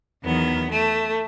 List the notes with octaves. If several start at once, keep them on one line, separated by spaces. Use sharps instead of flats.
E2 D#3 F#3 B3
A3